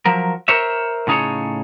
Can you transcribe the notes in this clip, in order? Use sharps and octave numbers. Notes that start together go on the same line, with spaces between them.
F3 F#3 A#4
A#4 C5 C#5 E5
A2 C#3 D#4 G#4 A4 C#5